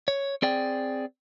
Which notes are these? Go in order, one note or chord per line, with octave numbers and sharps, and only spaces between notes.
C#5
C4 G#4 D5 G5